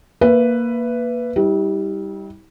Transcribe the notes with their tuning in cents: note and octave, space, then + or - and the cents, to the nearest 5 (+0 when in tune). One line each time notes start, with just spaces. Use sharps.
A#3 +5 B4 +0 E5 +30
G3 +0 E4 -45